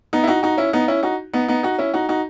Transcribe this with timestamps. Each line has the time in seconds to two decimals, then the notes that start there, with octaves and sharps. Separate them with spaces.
0.13 B3 D#4
0.24 E4
0.28 D#4 F#4
0.43 D#4 F#4
0.57 C#4 E4
0.73 B3 D#4
0.88 C#4 E4
1.03 D#4 F#4
1.33 B3 D#4
1.48 B3 D#4
1.63 D#4 F#4
1.78 C#4 E4
1.94 D#4 F#4
2.09 D#4 F#4